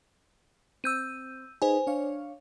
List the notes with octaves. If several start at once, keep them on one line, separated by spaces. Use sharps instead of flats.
C4 E6 G6 D#7
D#4 G#4 B4 C5 G#5
D4 C#5 F5